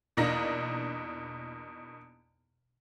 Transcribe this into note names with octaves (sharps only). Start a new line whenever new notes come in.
E2 B2 A#3 D4 D#4 A#6